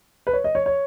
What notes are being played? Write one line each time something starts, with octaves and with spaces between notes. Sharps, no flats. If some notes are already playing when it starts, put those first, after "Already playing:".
B4
C#5
D#5
C#5
C#5